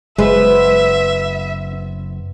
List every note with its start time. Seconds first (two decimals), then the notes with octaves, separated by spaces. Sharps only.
0.18 F#1 G#3 B3 B4 C5 E5